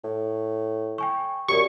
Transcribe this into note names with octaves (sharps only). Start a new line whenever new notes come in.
A2
G5 G#5 C#6
F#2 G4 A#4 D5 C#6